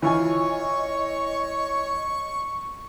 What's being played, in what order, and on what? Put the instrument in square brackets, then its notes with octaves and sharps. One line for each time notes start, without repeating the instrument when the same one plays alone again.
[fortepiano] E3 F4 G#5 [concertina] C#5 [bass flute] D#5 [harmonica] C#6